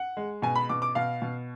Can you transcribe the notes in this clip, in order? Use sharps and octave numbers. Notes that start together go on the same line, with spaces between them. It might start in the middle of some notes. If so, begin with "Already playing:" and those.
Already playing: F#5
G#3
B2 G#5
B5
B2 D6
D6
B2 F5
B2